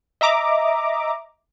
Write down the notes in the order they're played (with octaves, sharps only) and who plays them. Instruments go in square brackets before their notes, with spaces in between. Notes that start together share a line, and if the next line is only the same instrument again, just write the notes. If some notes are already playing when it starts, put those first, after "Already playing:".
[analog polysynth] D#5 E5 A#5 D6